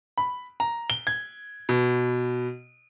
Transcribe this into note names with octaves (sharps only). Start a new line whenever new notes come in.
B5
A#5
G7
G#6
B2